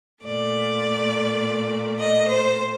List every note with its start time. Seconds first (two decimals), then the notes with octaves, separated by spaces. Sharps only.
0.23 A#2 A3 D5
1.98 D#5
2.27 C5